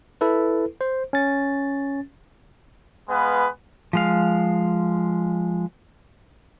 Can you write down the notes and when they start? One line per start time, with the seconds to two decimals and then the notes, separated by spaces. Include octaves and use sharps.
0.21 E4 A4 B4
0.81 C5
1.13 C#4 A6
3.09 G#3 B3 B4 F5
3.93 F3 G#3 F5